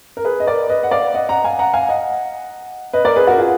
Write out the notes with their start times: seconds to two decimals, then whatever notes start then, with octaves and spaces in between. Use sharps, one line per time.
0.17 A#4
0.25 G#4 B4
0.40 D#5
0.47 A#4 D5
0.69 B4 D#5
0.83 F#5
0.91 D5 F5
1.14 D#5 F#5
1.29 F#5 A#5
1.44 F5 G#5
1.59 F#5 A#5
1.74 F5 G#5
1.89 D#5 F#5
2.93 B4 D#5
3.05 A#4 D5
3.16 G#4 B4
3.27 F#4 A#4
3.38 F4 G#4